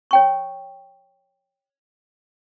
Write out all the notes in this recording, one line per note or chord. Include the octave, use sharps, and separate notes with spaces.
C#5 G5 C#6